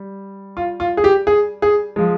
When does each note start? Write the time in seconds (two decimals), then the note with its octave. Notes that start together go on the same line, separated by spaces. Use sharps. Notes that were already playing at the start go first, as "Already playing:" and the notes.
Already playing: G3
0.57 F4
0.80 F4
0.97 G#4
1.04 G4
1.27 G#4
1.62 G#4
1.96 F3 G#3